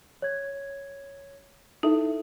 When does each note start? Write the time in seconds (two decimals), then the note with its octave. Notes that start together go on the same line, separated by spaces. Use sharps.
0.22 C#5 G#6
1.83 D#4 E4 A4 E5